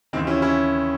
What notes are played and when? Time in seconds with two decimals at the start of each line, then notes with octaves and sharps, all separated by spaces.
0.13 D#2 C#3 E3 C4 D#4
0.27 C#4 E4
0.42 C#4 E4